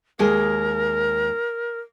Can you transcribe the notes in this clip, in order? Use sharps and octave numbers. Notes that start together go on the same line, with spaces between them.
D#2 G#3 G#4 A#4